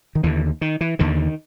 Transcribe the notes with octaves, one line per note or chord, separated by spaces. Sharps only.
D#3
D#2 D3 E3
D#3
E3
D#2 D3 D#3